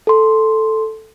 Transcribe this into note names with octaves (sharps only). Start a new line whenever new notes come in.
A4 C6